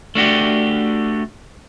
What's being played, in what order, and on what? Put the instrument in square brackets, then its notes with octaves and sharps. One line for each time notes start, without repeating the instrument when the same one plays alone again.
[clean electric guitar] A3 D4 F#4 G4